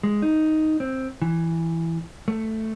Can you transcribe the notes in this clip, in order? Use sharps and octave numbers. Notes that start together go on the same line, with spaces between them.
G#3
D#4
C4
E3
A3